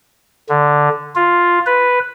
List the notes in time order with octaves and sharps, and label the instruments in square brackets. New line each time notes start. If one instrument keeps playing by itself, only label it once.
[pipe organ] D3
F4
B4